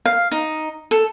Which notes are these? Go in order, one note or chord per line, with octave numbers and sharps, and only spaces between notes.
F5
D#4
A4